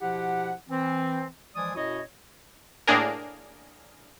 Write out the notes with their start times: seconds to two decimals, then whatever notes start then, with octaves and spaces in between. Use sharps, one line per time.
0.01 B2 F3 E4 G4 F#5
0.69 E3 C4
1.55 E3 F3 G#3 D5 G#5 D#6
1.75 F#2 B2 E4 F#4 C#5 D#5
2.87 A2 A#3 D4 G#4 A#4